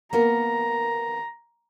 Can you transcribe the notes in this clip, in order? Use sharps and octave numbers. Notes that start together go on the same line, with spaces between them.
A#3 B3 A#4 A#5